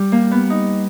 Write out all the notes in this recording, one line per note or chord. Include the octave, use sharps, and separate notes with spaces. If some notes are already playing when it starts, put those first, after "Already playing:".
Already playing: G3
A#3
B3
D#4